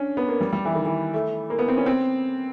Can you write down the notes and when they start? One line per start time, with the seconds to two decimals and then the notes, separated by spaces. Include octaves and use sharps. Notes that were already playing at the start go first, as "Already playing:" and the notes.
Already playing: C#4 D4
0.17 B3
0.29 A#3
0.41 G3
0.53 G3
0.65 E3
0.75 D#3
0.86 E3
1.14 A3
1.50 A#3
1.59 B3
1.68 C4
1.77 C#4
1.86 C4